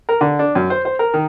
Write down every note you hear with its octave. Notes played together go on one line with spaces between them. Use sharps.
A#4
D3
D4
F#2
C5
C5
A#4
D#3